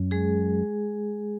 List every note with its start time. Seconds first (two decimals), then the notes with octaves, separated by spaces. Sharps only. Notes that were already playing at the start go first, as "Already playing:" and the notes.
Already playing: F#2
0.11 G#3 G#4